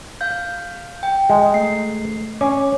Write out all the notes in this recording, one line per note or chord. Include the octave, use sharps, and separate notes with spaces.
F5 G6
G5
G#3
A3 C7
C#4 D6